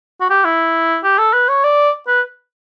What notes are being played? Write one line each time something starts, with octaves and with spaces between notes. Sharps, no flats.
F#4
G4
E4
G4
A4
B4
C#5
D5
B4